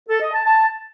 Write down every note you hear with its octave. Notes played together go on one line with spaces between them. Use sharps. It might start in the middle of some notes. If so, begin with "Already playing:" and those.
A4
D#5
A5
A5